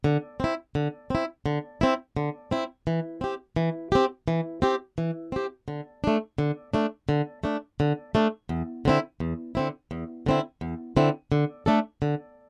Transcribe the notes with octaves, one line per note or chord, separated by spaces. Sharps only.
D3
C4 E4
D3
C4 E4
D3
C4 E4
D3
C4 E4
E3
C4 G4
E3
C4 G4
E3
C4 G4
E3
C4 G4
D3
A3 D4
D3
A3 D4
D3
A3 D4
D3
A3 D4
E2
D3 C4 E4
E2
D3 C4 E4
E2
D3 C4 E4
E2
D3 C4 E4
D3
A3 D4 A4
D3